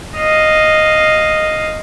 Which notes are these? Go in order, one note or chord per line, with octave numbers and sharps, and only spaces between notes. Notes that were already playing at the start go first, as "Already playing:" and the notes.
D#5 F5